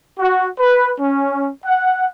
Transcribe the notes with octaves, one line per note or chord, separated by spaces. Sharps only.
F#4
B4
C#4
F#5